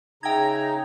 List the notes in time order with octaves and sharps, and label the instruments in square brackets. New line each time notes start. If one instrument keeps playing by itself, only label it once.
[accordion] C#3 [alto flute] D#4 [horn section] D#5 E5 A#5 [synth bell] G5 G#6